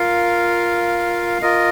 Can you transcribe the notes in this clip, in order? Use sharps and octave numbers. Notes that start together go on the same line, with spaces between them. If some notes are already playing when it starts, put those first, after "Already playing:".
Already playing: F4 A#4 F5
F4 A#4 D#5